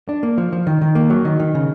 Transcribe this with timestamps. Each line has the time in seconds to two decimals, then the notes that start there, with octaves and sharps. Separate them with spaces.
0.09 D4
0.23 A#3
0.38 F3
0.53 F3
0.67 D#3
0.81 D#3
0.95 A#3
1.10 F#3
1.25 D#3
1.40 D#3
1.55 C#3